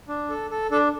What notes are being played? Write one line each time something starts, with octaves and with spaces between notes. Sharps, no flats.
D4
A4
A4
D4 A4